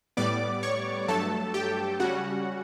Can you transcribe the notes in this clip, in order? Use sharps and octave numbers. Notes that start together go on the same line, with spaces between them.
A2 G3 B3 D5 D6
C#5 C#6
G2 F#3 A3 A4 A5
G4 G5
C#3 G3 C#4 F#4 F#5